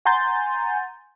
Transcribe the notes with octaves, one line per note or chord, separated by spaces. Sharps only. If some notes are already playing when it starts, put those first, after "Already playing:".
F#5 G#5 A#5 C6 G6 A6